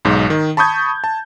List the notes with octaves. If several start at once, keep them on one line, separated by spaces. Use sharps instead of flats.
B1 G#2
D#3
A5 B5 C#6 D#6 G6 G#6
A5